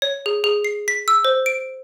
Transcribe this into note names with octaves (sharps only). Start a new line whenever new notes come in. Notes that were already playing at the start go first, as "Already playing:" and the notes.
C#5
G#4
G#4
C7
B6
E6
C5
D7